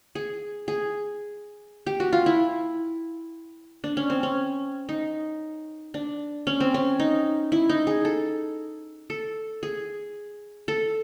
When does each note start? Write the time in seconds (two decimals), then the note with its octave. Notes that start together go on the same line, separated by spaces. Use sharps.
0.15 G#4
0.68 G#4
1.87 G4
2.00 F#4
2.13 F4
2.26 E4
3.84 D4
3.97 C#4
4.10 C4
4.23 C#4
4.89 D#4
5.94 D4
6.47 C#4
6.60 C4
6.74 C#4
7.00 D#4
7.52 E4
7.70 D#4
7.87 G#4
8.05 A4
9.10 A4
9.63 G#4
10.68 A4